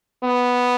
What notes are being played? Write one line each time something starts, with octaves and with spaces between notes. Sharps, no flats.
B3